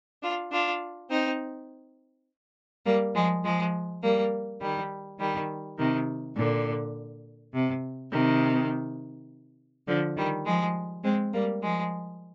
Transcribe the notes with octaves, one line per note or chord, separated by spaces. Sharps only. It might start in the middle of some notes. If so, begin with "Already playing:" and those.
D4 F4
D4 F4
C4 D#4
G3 A#3
F3 G#3
F3 G#3
G3 A#3
D#3 G3
D#3 G3
C3 D#3
A#2 D3
C3
C3 D#3
D3 F3
D#3 G3
F3 G#3
G#3 C4
G3 A#3
F3 G#3